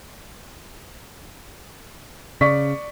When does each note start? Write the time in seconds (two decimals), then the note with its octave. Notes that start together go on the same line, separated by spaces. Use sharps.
2.41 C#3 D5 C#6 B6